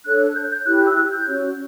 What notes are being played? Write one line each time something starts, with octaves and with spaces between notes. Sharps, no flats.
D4 A4 C#5 F#6
G6
G6
E4 G4 C#5 F#6
F#6
E6
F#6
G6
C#4 F#4 C#5